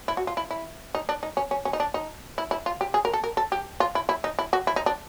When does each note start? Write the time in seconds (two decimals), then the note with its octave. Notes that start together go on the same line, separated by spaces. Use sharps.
0.08 E4
0.17 F#4
0.27 F4
0.37 E4
0.51 E4
0.95 D#4
1.09 D4
1.23 D#4
1.37 C#4
1.51 C#4
1.65 C#4
1.73 D#4
1.80 D4
1.94 D#4
2.38 E4
2.51 E4
2.66 F4
2.81 G4
2.94 G#4
3.05 A#4
3.13 A4
3.24 A#4
3.37 A4
3.52 G4
3.80 F4
3.95 E4
4.09 E4
4.24 D#4
4.39 E4
4.53 F#4
4.67 E4
4.76 D#4
4.86 D4